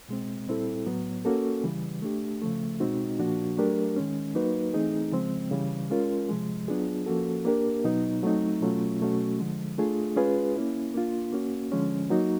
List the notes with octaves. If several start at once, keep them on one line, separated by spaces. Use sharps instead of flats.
B2 G#3 C4
A#2 G3 C4 E4 A4
A2 F#3 B3
A#3 C#4 F#4 A4
C#3 E3 G3
A3 D4 G4
C#3 F3 A3
B2 G#3 C4 D#4 F#4
A#2 F3 A#3 D4 F#4
F#3 A3 D4 G4 A#4
D#3 G#3 C#4
F#3 A#3 D#4 F#4 B4
E3 A3 C4 D#4 G#4
C#3 F3 G#3 C4
C#3 E3 G3
G#3 C#4 F4 A#4
C3 F3 G#3
F#3 B3 D4 F4 G#4
F3 A#3 C#4 F#4 A4
A#3 D4 G4 A#4
B2 F#3 B3 D#4
F#3 A3 C4 D#4
B2 F#3 A3 C#4 F4
B2 F#3 A3 C#4 F#4
D3 F3 G#3
A3 D4 F4 G#4
G#3 C#4 F4 G#4 B4
A#3 C#4 E4
A#3 D4 F4
A#3 C#4 F#4
D3 F3 G#3 C#4
F#3 A#3 D#4 F#4